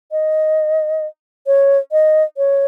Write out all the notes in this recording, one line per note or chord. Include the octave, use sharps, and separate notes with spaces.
D#5
C#5
D#5
C#5